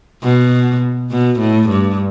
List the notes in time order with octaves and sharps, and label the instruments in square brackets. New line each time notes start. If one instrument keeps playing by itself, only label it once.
[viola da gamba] B2
B2
A2
G2